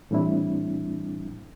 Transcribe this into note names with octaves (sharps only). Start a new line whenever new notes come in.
A2 E3 G3 C4 D4 E4